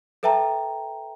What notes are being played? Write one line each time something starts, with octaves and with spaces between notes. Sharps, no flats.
A4 B4 E5 G5 A5 A#5